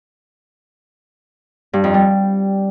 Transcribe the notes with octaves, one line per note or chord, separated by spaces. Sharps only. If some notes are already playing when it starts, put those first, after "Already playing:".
G2
F2
G3